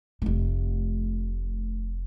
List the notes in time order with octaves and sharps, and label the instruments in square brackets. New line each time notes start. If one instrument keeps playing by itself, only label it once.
[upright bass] F1 A3